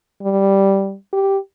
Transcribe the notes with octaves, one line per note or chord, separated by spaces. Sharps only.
G3
G4